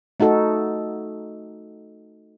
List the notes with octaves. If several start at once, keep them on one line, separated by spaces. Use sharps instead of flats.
A3 D#4 F#4 A4